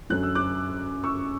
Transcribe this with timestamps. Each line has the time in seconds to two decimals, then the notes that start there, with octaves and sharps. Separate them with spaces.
0.10 F#2 D3 F#3 F#6
0.23 E6
0.35 D6 F#6
1.04 C#6 E6